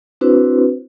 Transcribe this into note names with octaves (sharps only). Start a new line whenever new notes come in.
C4 D4 E4 F#4 B4 C5